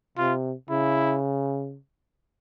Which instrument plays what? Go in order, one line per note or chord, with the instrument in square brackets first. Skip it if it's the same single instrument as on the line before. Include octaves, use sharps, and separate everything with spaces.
[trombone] C3 [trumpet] F4
[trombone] C#3 [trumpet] E4